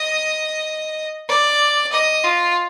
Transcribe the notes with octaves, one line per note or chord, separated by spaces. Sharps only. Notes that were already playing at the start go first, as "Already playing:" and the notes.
Already playing: D#5
D5
D#5
F4